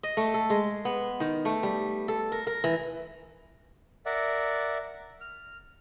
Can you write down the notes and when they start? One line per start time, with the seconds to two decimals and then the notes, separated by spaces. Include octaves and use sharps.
0.03 D#5
0.17 A3
0.34 A4
0.50 G#3
0.85 B3
1.20 D#3
1.45 A3
1.63 G3
2.08 A4
2.32 A#4
2.47 A#4
2.64 E3
4.06 A#4 D5 E5 F#5
5.21 F6